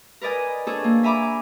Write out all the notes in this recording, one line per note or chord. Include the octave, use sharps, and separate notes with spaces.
A#4 B4 D5 D#5 G#5
D4 G#4 A4 C#5
A#3
E5 G#5 A#5 B5 D6